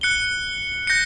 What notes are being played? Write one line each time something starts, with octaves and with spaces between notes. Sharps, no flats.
F#6 C#7 G7
G6 A#6 C#7